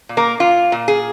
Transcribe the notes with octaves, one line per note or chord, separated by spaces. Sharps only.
A#2
A#3 A#4
A#2 F4
A#2
G#4